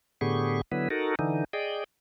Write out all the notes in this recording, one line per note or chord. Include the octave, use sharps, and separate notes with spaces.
A2 D3 B3 G4 G#4 C#6
D3 F#3 B3 E4 B4
D#4 F#4 A4 A#4
D3 E3 D#4
G#4 D5 D#5 G5